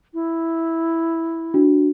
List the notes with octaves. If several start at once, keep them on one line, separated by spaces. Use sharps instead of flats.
E4
D4 F#4